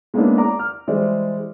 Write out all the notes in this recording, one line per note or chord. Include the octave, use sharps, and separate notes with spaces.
G#3 A#3 B3 C#4 D4 E4
D5 A#5 D6
F6
E3 G3 G#3 C5 D5 E5